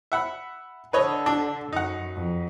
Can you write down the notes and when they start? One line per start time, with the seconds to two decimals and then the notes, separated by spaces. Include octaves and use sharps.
0.12 E5 F#5 B5
0.93 D3 A4 B4 C#5 D#5
1.26 D4
1.73 F#2 D#4 F#5
2.16 F2